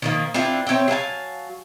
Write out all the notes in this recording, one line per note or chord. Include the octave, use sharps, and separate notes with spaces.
D#3 F3 A#3
C4 D4 E4 F4
C4 C#5 E5 G5
F#3 F5 G#5 A5